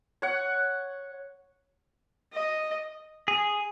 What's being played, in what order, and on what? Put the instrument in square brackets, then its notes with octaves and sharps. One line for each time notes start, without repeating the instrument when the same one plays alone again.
[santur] C#5 F#5
[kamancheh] D#5
[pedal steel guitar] G#4